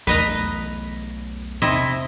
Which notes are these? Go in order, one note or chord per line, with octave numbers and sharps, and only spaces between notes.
B1 E2 A3 B4 D#5 A#5
C3 E4 D#5